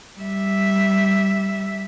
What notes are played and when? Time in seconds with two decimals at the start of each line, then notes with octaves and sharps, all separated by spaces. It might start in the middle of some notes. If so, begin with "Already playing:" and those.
0.18 G3 E5